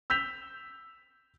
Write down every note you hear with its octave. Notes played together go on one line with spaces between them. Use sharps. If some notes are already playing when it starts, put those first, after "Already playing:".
E6 G6 B6 F7